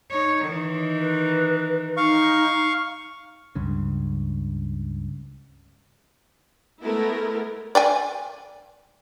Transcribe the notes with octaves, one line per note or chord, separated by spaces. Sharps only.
D#4 C#5
D#3 E3
B4
D#4 F5 C#6
C#2 G2 C#3
G#3 A3 B3 E4 A4 A#4
D5 G5 G#5